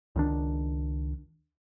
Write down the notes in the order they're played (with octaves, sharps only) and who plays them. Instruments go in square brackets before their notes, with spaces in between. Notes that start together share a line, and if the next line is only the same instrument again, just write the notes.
[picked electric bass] C#2 D#3 D4